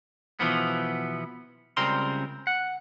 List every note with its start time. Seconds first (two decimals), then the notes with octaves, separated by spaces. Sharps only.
0.40 B2 E3 F3 B3
1.77 C#2 C#3 G3 C4 A#4 C6
2.47 F#5